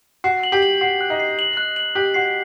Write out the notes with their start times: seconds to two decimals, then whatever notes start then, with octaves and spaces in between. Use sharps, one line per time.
0.24 F#4 C7
0.43 F#7
0.52 G4
0.63 F#7
0.81 F#4 C7
1.01 F#6
1.10 D#4
1.20 C7
1.39 F#7
1.57 F#6
1.76 F#7
1.95 G4 F#6
2.14 F#4 C7